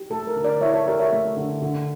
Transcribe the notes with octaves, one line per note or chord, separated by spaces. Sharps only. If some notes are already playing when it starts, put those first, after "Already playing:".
Already playing: G4
A3 A4
A#4
D3
A#4 D5
E4 C#5 E5
A4 C#5
G4 A#4 D5
C#5 E5
A3
D3
D3